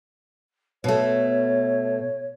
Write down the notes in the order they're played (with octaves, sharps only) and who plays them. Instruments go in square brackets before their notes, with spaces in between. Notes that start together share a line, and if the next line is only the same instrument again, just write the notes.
[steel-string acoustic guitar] B2 A3 [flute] C#5